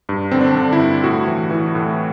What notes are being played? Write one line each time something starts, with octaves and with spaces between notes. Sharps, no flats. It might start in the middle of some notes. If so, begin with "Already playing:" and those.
G2
D3 C4
D4
D3
E4
G2
A2 F#4
E3
E3
A2